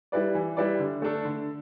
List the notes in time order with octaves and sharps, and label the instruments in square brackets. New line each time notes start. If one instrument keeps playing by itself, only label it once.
[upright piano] G3 E4 B4 D5
E3
G3 E4 B4 D5
D3
A3 D4 A4
D3